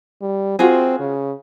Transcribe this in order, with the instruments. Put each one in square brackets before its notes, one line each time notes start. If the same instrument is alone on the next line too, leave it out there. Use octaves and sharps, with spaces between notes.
[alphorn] G3
[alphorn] C4 [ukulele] F4 F#4 G#4
[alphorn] C#3